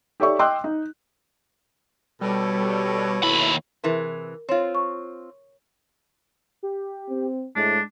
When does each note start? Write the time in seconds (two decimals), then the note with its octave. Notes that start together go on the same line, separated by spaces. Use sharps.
0.20 G4 A4 C#5 D5 E5 C#6
0.39 D#5 G5 C6 D6 E6 F#6
0.64 D#4
2.21 B2 G3 A4 C#5
3.23 D#2 E4 B5
3.84 C3 E3 G#4 A#4
4.49 C4 F4 C#5
4.75 C#6
6.63 G4
7.09 C4
7.56 A2 G#3 D4